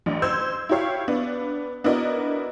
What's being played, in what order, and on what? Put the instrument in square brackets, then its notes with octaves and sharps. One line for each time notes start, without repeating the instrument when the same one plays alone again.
[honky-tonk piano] A1 D4
C5 E6 G6 G#6
E4 F#4 G4 C#5 F5
B3 D4
B3 D4 E4 F#4 A#4 D#5